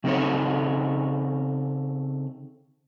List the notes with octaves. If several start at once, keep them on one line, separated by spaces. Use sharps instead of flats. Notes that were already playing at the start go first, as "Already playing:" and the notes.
C#3 C4 D#4 G4 A4 C#5